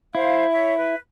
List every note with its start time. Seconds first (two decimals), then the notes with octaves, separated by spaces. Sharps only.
0.15 E4 C5 F5
0.52 C#5 E5
0.77 B4